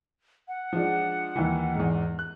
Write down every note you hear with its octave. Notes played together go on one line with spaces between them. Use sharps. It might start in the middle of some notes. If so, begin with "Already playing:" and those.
F#5
F3 G#3 D4
D#2 D#3 E3
E2 G#2
F#6